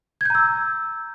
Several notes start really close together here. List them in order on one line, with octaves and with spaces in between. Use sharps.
G#6 G6 A#5 E6